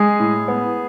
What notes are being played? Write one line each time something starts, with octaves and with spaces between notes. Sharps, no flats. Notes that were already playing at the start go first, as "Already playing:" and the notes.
Already playing: G#3 G#4
A2
B3